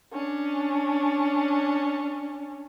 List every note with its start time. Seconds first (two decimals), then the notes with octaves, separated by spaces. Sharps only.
0.13 C#4 D4